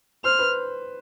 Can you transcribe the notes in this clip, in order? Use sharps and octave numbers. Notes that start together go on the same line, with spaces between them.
C5 F6
B4